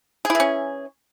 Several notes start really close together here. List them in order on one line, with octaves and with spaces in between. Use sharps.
G#4 E4 E3 C#4